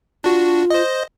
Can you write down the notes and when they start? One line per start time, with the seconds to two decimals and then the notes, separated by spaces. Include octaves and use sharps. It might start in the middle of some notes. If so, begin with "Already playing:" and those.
0.24 D4 F4 F#4
0.70 C5 D#5